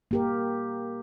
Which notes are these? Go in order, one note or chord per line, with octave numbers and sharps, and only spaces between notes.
A#3 G4 A#4